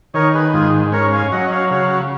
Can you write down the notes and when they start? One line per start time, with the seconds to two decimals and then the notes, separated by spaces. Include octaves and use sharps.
0.14 D#3 A#4 C#5
0.34 G#4 B4
0.54 G#2 F4 G#4
0.92 C#4 A#4 C#5
1.13 F5 G#5
1.31 F#3 D#5 F#5
1.46 D#5
1.52 C#5 F5
1.71 C#3 C#5 F5